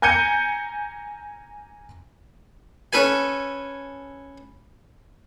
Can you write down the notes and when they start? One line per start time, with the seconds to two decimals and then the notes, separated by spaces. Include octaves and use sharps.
0.02 G#5 A#5 G6 G#6 C#7 D#7
2.93 C#4 A4 B4 G#5